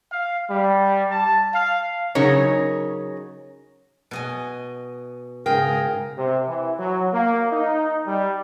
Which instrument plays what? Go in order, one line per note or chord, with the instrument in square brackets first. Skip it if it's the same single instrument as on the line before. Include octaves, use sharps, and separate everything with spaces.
[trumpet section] F5
G3
A5
F5
[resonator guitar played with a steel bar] C#3 F#3 D#4 A#4 C#5
[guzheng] B2 D#5 G#5
[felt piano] G#2 C#3 [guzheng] G#4 [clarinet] A#4 [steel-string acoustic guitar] G5
[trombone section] C3
E3
F#3
A#3
D#4
G3